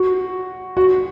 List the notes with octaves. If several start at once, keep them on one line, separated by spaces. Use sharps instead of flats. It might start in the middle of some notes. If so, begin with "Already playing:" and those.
Already playing: F#4
F#4